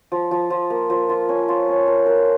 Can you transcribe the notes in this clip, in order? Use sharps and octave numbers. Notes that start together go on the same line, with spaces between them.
F3
F3
F3
A#3
F3
F4
C#4
F4
C#4
A#4
A#4